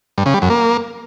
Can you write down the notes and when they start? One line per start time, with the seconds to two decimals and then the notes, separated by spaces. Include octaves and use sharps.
0.18 G2
0.26 C#3
0.34 G3
0.42 F#2
0.50 A#3